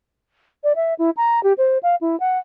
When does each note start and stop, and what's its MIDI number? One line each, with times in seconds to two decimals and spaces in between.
0.64 0.73 74
0.76 0.94 76
0.99 1.10 64
1.17 1.42 82
1.43 1.53 67
1.58 1.78 72
1.83 1.95 77
2.01 2.18 64
2.20 2.39 78